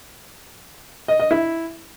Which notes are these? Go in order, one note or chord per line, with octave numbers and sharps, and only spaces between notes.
D#5
D#5
E4